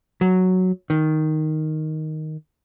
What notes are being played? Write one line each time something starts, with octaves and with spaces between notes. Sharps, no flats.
F#3
D#3